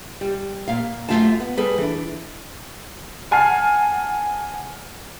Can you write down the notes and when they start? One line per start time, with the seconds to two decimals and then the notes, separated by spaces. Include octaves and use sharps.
0.21 G3
0.68 A#2 F5
1.09 F#2 F3 A3 F4 F5 A5
1.40 B3
1.57 G3 G#4 A4 B4
1.78 E3 D4
3.31 F#5 G#5 A5 F6 C7